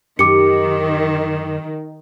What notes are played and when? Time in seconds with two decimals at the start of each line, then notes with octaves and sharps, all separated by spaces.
0.19 F#2 D#3 G4 D6 C#7